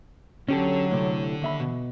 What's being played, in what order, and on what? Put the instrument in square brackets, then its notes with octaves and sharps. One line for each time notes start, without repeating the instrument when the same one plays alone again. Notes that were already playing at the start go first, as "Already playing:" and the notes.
[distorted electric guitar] D3 [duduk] F#3 [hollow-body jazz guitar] C#4 G4 A4
[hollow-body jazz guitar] A2 C3 A3
D#2 E5 B5
B2